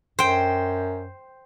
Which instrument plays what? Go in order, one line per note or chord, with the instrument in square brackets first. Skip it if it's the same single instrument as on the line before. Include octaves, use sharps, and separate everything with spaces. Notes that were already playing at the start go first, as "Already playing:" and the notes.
[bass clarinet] F#2 [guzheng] C5 G5